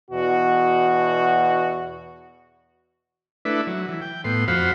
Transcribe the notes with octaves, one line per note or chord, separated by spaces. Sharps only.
E2 B2 F#4
A3 D4 E4 B4
F#3
E3
G5
A2 B3 C6
F2 F#4 C5 F5 B5